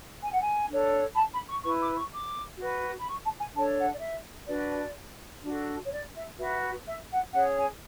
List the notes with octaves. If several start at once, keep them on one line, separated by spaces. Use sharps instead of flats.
G#5
F#5
G#5
D4 A4 C#5
B5
A5
B5
C#6
E4 B4 C#6
D6
C#6
D6
F#4 B4
B5
C#6
A5
G#5
D4 A4 C#5 A5
F#5
D5
E5
D4 F#4 B4 D5
D4 F#4 A4
C#5
D5
E5
F#4 B4 E5
E5
F#5
C#4 G#4 C#5 F#5
G#5